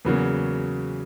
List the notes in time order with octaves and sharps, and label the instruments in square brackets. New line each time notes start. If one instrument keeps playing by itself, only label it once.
[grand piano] E2 C#3 F#3 A#3 B4